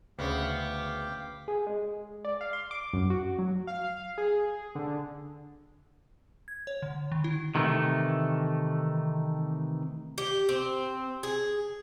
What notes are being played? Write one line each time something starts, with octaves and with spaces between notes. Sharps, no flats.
D2 C#3 B3 F5 G5 D6
G#4
G#3
D5
F5
C6
D6
F#2
F#4
F#3
F5
G#4
D3
G#6
C#5
D3
D#3
E4
C3 D#3 E3 A3
G4
C4
G#4